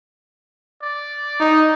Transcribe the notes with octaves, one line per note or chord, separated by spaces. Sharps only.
D5
D#4